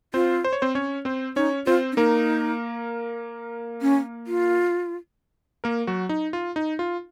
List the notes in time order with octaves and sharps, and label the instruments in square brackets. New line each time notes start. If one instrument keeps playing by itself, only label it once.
[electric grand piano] C4 C5 [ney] F4
[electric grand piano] C5
C#5
C4 C5
C#4 C#5
C4 C5
[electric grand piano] C#4 C#5 [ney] D#4
[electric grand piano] C4 C5 [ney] F4
[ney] C#4
[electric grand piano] A#3 A#4 [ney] D#4
[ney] C#4
F4
[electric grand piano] A#3 A#4
F#3 F#4
D#4
F4
D#4
F4